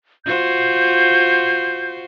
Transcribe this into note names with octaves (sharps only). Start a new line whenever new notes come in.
F4 F#4 C5 G6